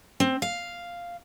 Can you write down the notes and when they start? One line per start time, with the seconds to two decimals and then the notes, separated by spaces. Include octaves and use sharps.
0.20 C4
0.42 F5